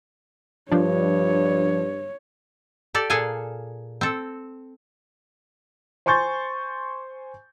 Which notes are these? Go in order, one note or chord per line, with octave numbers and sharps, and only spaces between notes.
G2 F3 D4 C#5
G4 A4 D5
A#2 G#4 A4 F5 G#5
C4 A4
C5 G#5 C6 C#6 G6 A6